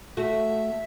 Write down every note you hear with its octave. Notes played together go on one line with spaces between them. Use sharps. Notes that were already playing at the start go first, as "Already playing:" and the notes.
A3 F#4 E5